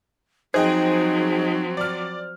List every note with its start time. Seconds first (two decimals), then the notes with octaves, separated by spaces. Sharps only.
0.54 F3 F#3 C4 D#4 G#4 C5 D#5 G5
1.77 D5 F6